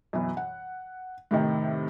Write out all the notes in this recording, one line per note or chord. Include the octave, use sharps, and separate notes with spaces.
F#2 B2 E3
F#5
A2 C3 D#3